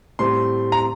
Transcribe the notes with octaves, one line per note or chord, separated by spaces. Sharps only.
A2 G3 C4 C6
A#5